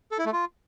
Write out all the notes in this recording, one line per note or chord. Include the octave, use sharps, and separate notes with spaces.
A4
E4
A3
F4